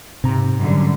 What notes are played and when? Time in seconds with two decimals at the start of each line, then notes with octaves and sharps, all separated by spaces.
0.24 G#2 C3 A#5
0.58 F#2 D3 G3